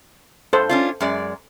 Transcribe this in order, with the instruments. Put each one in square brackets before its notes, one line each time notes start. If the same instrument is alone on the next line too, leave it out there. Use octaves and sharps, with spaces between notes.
[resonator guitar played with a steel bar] G2 [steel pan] A4 C5
[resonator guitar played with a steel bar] C#4 D4 F4
F#2 G#3 D5